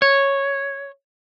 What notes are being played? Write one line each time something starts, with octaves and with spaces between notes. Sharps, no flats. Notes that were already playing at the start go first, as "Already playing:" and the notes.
C#5